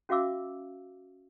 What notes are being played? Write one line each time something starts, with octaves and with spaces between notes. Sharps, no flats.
C#4 F#4 E5 F5 D6 E6